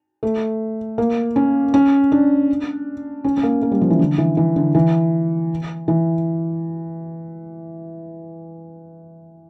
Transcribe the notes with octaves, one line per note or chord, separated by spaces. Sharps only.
A3
A#3
C#4
C#4
D4
C#4
C#4
A#3
A#3
G3
F3
E3
D3
E3
E3
D3
E3
E3